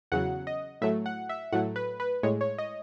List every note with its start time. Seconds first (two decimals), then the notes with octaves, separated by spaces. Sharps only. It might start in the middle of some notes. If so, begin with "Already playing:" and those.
0.12 E2 C#3 F#3 F#5
0.47 D#5
0.81 A2 F#3 A3 E5
1.06 F#5
1.29 E5
1.52 A2 F#3 A3 F#5
1.76 B4
2.00 B4
2.23 A2 G#3 C#5
2.41 C#5
2.58 D#5